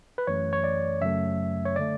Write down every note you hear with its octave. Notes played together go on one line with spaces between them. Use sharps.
B4
F#2 E3 A3 C#5
C#5
D5
F#2 C#3 F#3 A3 E5
C#5
D3 A3 D5